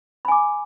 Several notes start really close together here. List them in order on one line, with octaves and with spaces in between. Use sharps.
B5 G#5 D6